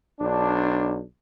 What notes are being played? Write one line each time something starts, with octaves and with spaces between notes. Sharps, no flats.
B1 D4